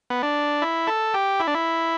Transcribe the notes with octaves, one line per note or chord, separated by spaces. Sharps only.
B3
D4
E4
A4
G4
E4
D4
E4